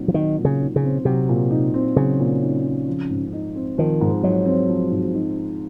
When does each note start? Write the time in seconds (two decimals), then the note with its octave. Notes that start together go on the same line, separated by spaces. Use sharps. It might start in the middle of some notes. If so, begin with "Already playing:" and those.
Already playing: A#2 F#3 C4 D#4
0.08 F3
0.14 D#3 F#3
0.38 A#2
0.45 C#3
0.60 D#4
0.76 C#3
0.84 C4
1.05 C3 F#3
1.29 A#2
1.50 D#4
1.74 C4
1.96 C#3 F#3
2.20 A#2
2.41 D#4
2.64 C4
2.88 F3
3.10 G#2
3.33 D#4
3.55 C4
3.78 D#3 F3
4.01 G#2
4.23 F#3 D#4
4.45 C4
4.69 F3
4.91 G#2
5.14 D#4
5.37 C4